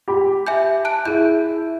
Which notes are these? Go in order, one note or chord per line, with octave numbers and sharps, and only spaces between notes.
G4 B5
E5 G#5 G6
A5 F#6 D7
E4 G#4 G6